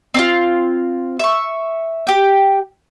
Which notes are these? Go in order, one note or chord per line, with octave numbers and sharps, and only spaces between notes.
C4 D4 F4
E5 C#6
G4 G5